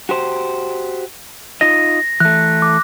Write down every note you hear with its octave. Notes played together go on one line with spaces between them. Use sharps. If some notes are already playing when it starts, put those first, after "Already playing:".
F#4 G4 C5
D#4 F4 D#5 A#6
E3 A3 F#6
D6